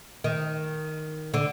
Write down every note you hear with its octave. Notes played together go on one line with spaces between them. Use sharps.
D#3
D3